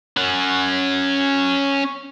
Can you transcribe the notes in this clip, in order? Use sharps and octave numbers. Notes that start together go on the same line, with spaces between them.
C#4 F#5